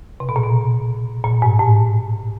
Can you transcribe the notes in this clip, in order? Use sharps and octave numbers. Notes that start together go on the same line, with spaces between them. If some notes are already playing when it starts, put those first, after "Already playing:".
C3
B2
A#2
B2
A#2
G#2
A2